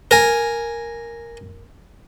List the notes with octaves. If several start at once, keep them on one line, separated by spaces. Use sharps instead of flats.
A#4 G#5